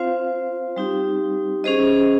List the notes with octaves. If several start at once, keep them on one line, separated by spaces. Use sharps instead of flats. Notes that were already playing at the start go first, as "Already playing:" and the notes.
Already playing: C4 F4 C5 F5
G3 C4 D#4 G4
C#4 G#4 C5 D#5